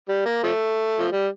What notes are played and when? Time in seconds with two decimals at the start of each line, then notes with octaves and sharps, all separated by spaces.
0.08 G3
0.25 A#3
0.43 F3 A3
0.98 F3
1.12 G3